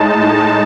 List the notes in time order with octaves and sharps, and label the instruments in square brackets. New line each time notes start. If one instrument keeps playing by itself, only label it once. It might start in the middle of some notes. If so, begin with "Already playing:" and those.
Already playing: [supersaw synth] A2 G#3 D#4 A5